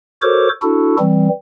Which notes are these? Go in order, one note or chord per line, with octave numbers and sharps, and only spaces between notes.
F#4 A4 A#4 C5 C#5 D6
D4 E4 F#4 A4
E3 G3 C4